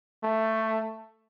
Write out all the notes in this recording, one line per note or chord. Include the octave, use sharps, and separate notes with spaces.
A3